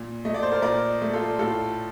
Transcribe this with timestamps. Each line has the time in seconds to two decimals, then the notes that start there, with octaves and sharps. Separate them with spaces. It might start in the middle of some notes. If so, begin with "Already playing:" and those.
Already playing: A#2
0.25 A3 D#5
0.34 D5
0.43 C5
0.52 A#4 D5
0.62 A#2 A#4 D5
1.02 A3
1.13 F4 A4
1.39 A2 F4 A4